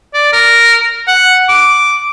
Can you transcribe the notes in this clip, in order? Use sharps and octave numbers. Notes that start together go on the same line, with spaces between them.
D5
A#4
F#5
D6